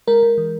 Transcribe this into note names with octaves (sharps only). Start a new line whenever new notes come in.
G#3 A#4
G#3
E3